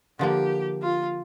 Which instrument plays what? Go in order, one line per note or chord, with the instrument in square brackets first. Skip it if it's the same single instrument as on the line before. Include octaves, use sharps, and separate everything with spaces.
[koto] D3 F3 A#3 [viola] G4
[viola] F4